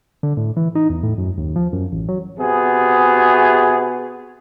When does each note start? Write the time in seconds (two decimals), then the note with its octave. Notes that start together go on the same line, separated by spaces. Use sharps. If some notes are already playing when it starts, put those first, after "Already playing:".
0.23 D3
0.37 A2
0.57 E3
0.75 D#4
0.89 E2
1.03 A2
1.18 F#2
1.38 D#2
1.56 F3
1.73 F#2
1.92 A1
2.09 F#3
2.39 C3 B3 F#4 G#4